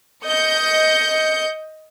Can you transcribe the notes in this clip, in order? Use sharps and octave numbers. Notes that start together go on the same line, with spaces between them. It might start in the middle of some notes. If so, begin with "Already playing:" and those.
D#5 G6 C#7